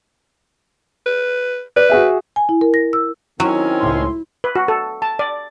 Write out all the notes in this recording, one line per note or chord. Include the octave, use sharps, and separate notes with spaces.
B4
B4 D5
F#4 G#4 E5
G#5
E4
A#4
A#6
E6
D#3 F#3 C4 C#4 E4
C#2 A2 C6
B4
F#4
A4
A5
D5